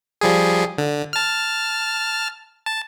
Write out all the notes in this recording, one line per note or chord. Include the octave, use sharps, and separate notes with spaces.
F3 G3 G#4
D3
A5 F6
A5